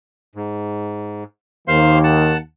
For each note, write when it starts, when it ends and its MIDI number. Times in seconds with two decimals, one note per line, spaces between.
0.35 1.24 44
1.68 2.36 39
1.68 2.36 51
1.68 2.36 58
1.68 1.98 72
1.68 1.98 77
1.68 1.98 84
2.04 2.37 78
2.04 2.37 81